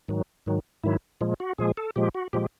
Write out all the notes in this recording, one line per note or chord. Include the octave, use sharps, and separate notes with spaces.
G#2 D#3 F#3
G#2 D#3 F#3
G#2 D#3 F#3 E4
A#2 F3 G#3
F#4
A#2 F3 G#3 G#4
A4
A#2 F3 G#3 G4
F#4
A#2 F3 G#3 G4